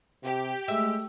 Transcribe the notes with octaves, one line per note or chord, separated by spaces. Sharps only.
C3 G4
G#3 A3 E5